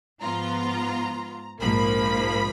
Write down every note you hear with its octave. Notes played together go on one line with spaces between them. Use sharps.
G#2 F3 B3 F4 A#5
A#1 G#2 F3 A#3 B5